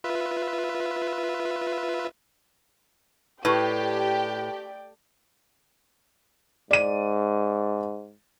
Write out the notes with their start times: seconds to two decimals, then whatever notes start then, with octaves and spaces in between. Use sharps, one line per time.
0.04 F4 B4 E5
3.45 A2 G4 B4 D5 G5
6.71 G#2 D5 D#7